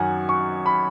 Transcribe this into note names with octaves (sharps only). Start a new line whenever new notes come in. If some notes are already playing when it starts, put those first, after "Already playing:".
Already playing: F#2 D#3 F#5 G#5
C#6
B5